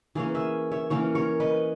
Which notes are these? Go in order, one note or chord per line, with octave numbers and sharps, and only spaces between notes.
E3 A#3 C#4 G#4 B4
E5 G#5
C#5 E5
E3 A#3 C#4 A#4 C#5
A#4 C#5
B4 D#5